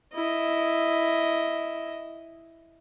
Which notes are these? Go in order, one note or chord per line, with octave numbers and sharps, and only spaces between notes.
E4 D#5